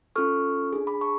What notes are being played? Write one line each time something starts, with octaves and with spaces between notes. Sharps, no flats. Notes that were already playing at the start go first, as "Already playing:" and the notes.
C#4 F4 A4 C#6 F6
D4 G#4
B5 D6
A5 C#6